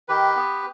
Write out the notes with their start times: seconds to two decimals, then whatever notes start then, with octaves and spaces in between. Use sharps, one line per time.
0.08 D#3 G4 B4
0.36 B3